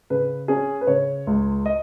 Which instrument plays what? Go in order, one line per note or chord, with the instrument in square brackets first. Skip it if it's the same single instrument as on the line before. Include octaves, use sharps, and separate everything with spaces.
[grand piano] C#3 B4
C#4 G#4
B4
C#3 C#5
C#2
D#5